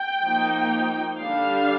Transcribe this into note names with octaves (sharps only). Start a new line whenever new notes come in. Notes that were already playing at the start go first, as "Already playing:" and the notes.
Already playing: G5
F3 A#3 D#4
D3 G3 D4 F5